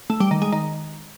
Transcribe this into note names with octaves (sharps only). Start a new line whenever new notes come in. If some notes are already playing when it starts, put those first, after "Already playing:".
A3
G3
D#3
G#3
D#3